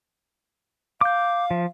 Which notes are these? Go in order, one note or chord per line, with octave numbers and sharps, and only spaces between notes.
F5 D6 G6
F3